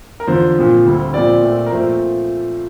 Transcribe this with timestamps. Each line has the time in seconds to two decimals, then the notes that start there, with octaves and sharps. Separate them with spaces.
0.20 A#4
0.27 E2 D3 F3 C5
0.57 A#2 F3 C4
0.85 D2 D3 G3 C4
1.14 A#2 F3 C4 D5
1.43 A#2 A3 C4
1.66 A#4
1.71 A#2 F3 A3 C4 C5